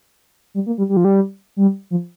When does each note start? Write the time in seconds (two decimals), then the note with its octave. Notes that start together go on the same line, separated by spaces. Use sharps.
0.54 G3
0.66 A#3
0.78 G3
0.89 G3
0.97 F3
1.05 G3
1.57 G3
1.91 F3